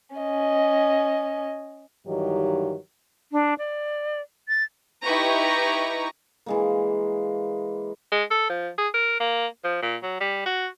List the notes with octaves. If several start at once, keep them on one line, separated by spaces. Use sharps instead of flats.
C#4 D#5
G2 D#3 E3 F#3 D#4 G4
D4
D5
A6
D#4 E4 G4 B4 A#5 C#6
E3 G#3 A#3
G#3
A4
F3
G#4
A#4
A#3
F3
A#2
F#3
G3
F#4